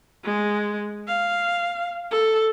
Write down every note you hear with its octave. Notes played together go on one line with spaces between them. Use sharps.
G#3
F5
A4